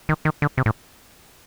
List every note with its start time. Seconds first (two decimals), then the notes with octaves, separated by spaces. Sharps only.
0.09 D#3
0.25 D#3
0.42 D3
0.57 C3
0.66 A2